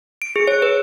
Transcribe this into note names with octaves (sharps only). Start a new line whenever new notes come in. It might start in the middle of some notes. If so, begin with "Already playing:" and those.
D7
G#4
C#5
B4